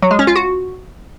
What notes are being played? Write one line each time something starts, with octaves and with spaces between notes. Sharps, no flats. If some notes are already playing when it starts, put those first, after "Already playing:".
F#3
G#3
C#4
F4
F#4